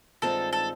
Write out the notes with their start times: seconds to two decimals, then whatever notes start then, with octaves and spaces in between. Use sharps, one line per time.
0.22 G2 D#3 G#3 C4 F4 A4
0.53 A4